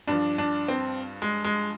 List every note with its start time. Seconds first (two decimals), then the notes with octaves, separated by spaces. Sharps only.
0.07 G2 F3 D4
0.38 D4
0.68 C4
1.22 G#3
1.45 G#3